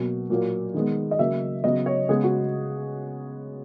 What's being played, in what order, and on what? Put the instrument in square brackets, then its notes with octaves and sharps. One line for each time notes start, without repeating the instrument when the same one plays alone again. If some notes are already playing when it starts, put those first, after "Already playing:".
Already playing: [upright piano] B2 F#3 A#3
A#2 F#3 A#3
D#3 G#3 B3
D#5
C#3 F#3 A#3 E5
C#3 F#3 B3 D#5
C#5
C#3 G#3 B3 G#4
F#4